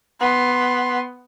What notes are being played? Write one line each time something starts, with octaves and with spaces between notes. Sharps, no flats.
B3 C6